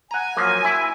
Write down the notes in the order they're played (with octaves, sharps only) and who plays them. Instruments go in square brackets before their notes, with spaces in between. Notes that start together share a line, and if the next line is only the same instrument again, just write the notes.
[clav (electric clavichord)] F#5 A#5 [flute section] G#5
[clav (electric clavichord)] F3 F#3 A#3
E4